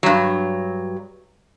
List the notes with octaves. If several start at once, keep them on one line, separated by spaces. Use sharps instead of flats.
G2 F#3